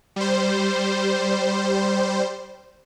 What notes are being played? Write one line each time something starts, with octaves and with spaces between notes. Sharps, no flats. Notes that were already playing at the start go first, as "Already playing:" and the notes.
G3 C5